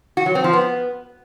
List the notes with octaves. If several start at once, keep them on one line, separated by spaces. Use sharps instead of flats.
F#4
F#3
C4
F3
B3